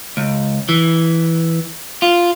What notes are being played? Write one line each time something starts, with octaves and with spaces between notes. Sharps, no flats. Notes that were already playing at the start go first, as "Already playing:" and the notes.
C#2
E3
F4